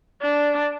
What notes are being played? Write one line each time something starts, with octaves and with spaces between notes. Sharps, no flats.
D4